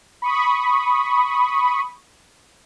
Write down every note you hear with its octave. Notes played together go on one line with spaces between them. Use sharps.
B5 C#6 D#6